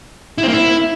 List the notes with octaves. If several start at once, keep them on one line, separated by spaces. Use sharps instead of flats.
E4
C4
A#3
E4